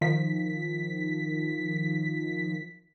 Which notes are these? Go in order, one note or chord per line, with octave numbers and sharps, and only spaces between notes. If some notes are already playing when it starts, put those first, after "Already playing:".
D#3 F3 B6